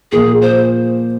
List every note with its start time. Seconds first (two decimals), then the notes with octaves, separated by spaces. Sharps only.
0.12 A#2 F3 A#3 G#4
0.41 C5